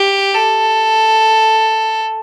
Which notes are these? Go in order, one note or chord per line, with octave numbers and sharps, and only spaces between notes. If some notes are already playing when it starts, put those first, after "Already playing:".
Already playing: G4
A4